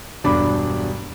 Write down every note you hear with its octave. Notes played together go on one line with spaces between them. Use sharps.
E1 G2 D4 B5 D6